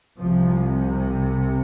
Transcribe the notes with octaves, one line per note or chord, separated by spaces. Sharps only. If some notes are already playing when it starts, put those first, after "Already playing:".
C2 C3 F3